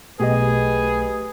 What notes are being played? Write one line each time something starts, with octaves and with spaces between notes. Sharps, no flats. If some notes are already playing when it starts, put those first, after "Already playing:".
B1 A3 G4 G#4 B4 D#5